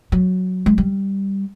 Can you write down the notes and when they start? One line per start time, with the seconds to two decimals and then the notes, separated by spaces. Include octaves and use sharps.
0.12 F#3
0.66 G#3
0.78 G3